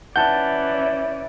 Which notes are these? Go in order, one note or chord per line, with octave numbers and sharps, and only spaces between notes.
E3 C#4 D5 F#5 A5 G6